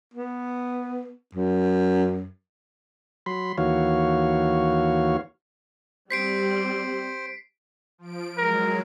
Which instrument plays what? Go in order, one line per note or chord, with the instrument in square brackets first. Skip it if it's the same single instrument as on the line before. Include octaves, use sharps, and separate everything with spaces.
[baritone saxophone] B3
F#2
[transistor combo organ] F#3 B5 C6
D#2 E3 F#4 C#5 F5
[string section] G3 C4 [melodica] C5 [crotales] B6 C7 D7
[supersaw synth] F3 D7
[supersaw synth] F#3 G#3 [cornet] A#4